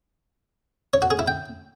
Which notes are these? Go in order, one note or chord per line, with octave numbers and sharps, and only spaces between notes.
C#5
F#4
G#4
E4
G5